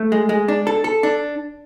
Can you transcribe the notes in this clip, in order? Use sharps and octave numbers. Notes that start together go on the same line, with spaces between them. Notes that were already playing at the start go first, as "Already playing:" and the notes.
Already playing: A3
G#3
G#3
D4
A4
A4
D4